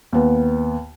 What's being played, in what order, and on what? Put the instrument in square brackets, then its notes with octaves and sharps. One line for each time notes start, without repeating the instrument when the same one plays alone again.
[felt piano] D#2 B3